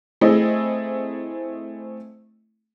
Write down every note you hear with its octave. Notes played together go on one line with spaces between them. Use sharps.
A3 C4 E4 G#4 D#5